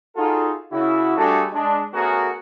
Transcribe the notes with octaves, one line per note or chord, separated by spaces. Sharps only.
D#4 F4 F#4 G#4 A4
C#3 E4 F#4
G3 A3 D4 F#4 G#4 A4
G#3 D4
A3 B3 C#4 F#4 G#4 A#4